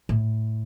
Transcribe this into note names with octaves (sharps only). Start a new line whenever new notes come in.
A2